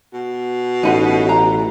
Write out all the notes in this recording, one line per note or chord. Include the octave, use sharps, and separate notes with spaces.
B2
A1 D#4 B4 F#5
A#5